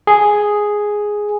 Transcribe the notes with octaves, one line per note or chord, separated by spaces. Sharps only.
G#4